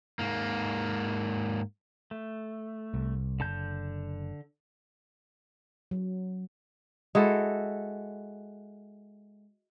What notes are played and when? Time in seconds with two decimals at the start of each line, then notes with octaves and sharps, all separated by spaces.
0.19 G#2 A#3
2.11 A3
2.94 C2
3.40 F#1 D3 A5 G6
5.91 F#3
7.15 G#3 E4 F#4 A4